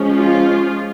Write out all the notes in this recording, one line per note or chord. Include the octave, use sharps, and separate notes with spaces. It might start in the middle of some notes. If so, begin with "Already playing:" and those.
Already playing: F3 G#3 C#4
F4